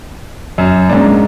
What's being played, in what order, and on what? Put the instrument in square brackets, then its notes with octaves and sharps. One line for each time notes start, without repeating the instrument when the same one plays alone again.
[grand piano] F#2
[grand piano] G#2 D4 [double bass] A#3 C#4